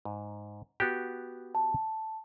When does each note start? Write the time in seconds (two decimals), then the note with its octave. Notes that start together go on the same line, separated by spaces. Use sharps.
0.05 G#2
0.80 B3 F#4 G4
1.55 A5